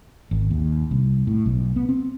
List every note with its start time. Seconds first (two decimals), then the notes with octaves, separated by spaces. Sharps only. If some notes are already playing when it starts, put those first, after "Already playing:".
0.31 G#1
0.50 D#2
0.91 C2
1.27 A2
1.46 B1
1.76 B3
1.89 C4